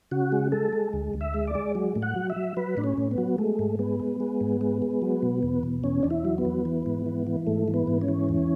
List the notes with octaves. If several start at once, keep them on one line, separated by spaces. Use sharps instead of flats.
C#3 F#4
G#3
G#3 A4
G#3
D2
D2
E5
G#3
D5
G#3
F#3
A2
F#5
F#3
E5
F#3
F#3 B4
A2 D4
C#4
A2
B3
F#3
G#3 A3
G#2
G#3 B3
G#3
G#3
G#2
G#3
G#3
F#3
B2
E2
B2
E2 C#4
E2 D4
E4
F#3
B3
E2
E3
G#2
E3
E3
G#2 A3
E3
B3
G#2
C#4
E3
E2